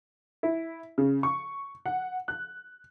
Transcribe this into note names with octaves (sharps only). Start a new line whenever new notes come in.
E4
C#3
C#6
F#5
F#6